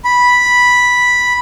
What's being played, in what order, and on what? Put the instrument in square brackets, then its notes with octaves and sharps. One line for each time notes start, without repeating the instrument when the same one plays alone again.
[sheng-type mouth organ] B5